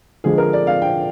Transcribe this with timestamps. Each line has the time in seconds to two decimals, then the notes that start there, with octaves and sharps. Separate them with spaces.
0.24 D3 F3 G#3 G#4
0.38 A#4
0.53 D5
0.67 F5
0.82 G5